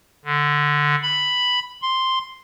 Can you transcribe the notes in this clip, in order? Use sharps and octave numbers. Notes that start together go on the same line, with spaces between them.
D3
B5
C6